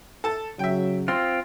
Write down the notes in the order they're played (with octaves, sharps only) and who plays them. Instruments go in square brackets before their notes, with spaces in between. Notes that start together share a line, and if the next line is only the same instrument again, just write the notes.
[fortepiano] A4 A5
[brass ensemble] C#3 F#3 [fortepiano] E5 G5
[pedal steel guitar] C4 F4 [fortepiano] C6